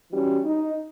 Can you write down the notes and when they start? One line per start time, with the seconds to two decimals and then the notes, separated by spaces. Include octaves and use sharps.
0.11 E3 G3 C#4 F#4
0.44 D#4